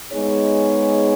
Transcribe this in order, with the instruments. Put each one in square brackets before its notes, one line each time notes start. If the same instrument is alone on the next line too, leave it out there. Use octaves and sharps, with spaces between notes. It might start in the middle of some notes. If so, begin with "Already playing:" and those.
[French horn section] G#3 B3 D#4 G#4 C#5